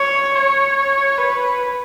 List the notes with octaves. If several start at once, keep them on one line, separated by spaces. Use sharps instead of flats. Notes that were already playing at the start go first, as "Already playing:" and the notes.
Already playing: C#5
C#5
B4